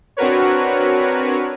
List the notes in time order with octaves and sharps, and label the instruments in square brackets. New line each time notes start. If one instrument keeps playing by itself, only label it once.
[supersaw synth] C4 D4 F#4 A#4 B4 C#5